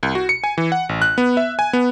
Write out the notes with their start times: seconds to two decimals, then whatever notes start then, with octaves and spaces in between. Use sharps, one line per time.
0.03 C2
0.15 F#4
0.29 C#7
0.44 G#5
0.58 E3
0.72 F#5
0.89 A1
1.02 F#6
1.18 B3
1.37 E5
1.59 G#5
1.73 B3